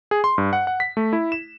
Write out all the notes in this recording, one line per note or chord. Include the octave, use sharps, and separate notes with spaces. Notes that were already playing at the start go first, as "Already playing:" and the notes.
G#4
C6
G2
F#5
F#5
B6
A3
E4
E7